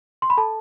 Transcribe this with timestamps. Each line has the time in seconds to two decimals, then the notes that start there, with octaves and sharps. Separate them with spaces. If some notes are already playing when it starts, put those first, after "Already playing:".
0.22 C6
0.30 B5
0.37 A4 A5